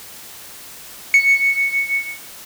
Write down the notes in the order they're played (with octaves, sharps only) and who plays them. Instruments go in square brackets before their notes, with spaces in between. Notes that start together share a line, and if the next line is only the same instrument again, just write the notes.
[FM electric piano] C#7